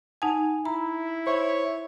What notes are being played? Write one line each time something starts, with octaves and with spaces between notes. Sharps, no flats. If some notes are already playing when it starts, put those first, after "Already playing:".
D#4 F#5 G#5 A5
E4 A#5 B5
C5 C#5 E5